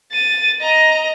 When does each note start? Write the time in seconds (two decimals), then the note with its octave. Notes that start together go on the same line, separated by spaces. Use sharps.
0.12 A6 D#7
0.61 D#5 A#5